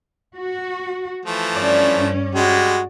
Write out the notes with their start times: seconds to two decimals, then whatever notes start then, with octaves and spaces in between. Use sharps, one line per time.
0.37 F#4
1.26 E3 F3 A3
1.56 G2 C#4 D5
2.35 G3 G#3 F#4